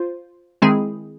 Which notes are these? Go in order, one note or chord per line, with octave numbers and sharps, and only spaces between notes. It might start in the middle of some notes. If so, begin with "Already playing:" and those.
Already playing: F4 C5
D#3 G#3 C4 E4 G#4